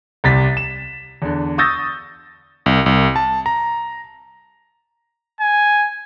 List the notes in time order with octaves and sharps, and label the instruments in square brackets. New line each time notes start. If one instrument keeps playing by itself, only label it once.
[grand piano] C2 C3 A6 B6
E7
E2 D3
C#6 D#6 E6 G6 A6 A#6
[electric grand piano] C2
C2
A5
A#5
[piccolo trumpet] G#5